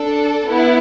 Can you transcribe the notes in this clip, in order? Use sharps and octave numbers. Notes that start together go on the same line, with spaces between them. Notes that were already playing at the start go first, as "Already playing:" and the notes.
Already playing: D4 A4
B3 E4